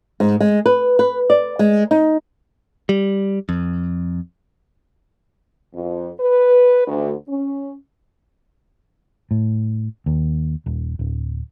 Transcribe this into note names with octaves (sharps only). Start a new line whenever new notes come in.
G#2
G#3
B4
B4
D5
G#3
D#4
G3
F2
F2
B4
D2
C#4
A2
D#2
D#1
D1